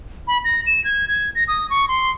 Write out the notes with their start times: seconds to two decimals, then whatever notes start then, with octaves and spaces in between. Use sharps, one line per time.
0.28 B5
0.44 A#6
0.67 E7
0.84 G#6
1.08 G#6
1.35 A#6
1.48 D#6
1.70 C#6
1.88 C6